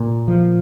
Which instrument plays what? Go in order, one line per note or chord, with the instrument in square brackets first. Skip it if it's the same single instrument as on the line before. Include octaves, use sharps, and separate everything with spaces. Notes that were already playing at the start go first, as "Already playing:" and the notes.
Already playing: [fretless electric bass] A#2
F3